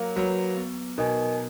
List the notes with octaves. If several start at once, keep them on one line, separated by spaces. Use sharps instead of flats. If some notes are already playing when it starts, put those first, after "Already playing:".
Already playing: F#3 A#3
F#3 F#4 B4
B3
B2 D#4 A#4 D#5 G#5